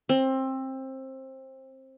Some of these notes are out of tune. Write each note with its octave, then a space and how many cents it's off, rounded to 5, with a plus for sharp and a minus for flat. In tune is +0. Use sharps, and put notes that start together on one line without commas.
C4 +20